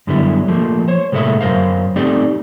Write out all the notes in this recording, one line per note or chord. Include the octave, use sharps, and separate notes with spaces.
F#2 D3 G3 B3 E4
F3 A3 A#3
C5 C#5
A2 C3 G#3 A#3 A4 E5
F#2 A#4 C5 F5
A3 C4 D#4 G4 D5